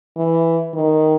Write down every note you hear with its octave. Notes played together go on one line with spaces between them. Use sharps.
E3
D#3